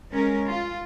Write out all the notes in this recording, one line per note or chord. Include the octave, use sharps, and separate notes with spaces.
G#3 C#4 A#4
F4